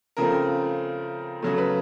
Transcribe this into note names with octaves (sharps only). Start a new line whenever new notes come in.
C#3 F3 A3 C4 A#4
C#3 F#3 A3
B4